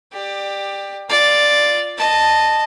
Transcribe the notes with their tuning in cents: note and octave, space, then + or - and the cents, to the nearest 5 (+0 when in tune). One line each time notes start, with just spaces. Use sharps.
G4 +10 D5 +25
F4 +0 D5 +0
D#5 -15 A5 +0